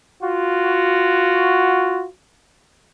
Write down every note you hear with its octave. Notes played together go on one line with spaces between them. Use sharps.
F4 F#4